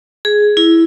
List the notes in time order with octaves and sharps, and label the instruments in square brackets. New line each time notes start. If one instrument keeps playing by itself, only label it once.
[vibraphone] G#4
E4